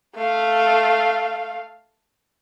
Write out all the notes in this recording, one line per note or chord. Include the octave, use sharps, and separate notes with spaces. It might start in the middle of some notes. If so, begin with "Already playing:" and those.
A3 F5